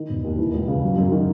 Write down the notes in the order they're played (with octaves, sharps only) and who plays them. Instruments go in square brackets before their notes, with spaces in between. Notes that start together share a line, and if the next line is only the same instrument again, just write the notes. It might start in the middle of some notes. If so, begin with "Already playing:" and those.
Already playing: [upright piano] D#3
E1
D#2
E3
C#2
C#3
F#3
F#2
D#3